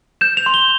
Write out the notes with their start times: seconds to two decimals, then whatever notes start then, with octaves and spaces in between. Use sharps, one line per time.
0.21 G6 E7
0.37 F7
0.46 C6
0.54 G7